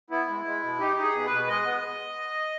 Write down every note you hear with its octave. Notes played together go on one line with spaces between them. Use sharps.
B3 E4
G#3
G#3
B2
D#4 G4
D#4
G#4
B2
B4
B2
G#3 D#5
B3